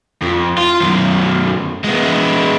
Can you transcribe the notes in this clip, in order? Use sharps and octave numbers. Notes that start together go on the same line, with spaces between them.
F2
F4
F#2 D#3
G#3 B3